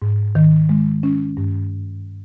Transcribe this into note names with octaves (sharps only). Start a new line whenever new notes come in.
G#2
D#3
G#3
C#4
G2